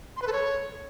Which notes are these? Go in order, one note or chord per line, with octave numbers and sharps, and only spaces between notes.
C6
B4
A4
C#5